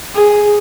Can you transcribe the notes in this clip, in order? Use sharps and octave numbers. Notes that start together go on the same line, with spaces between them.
G#4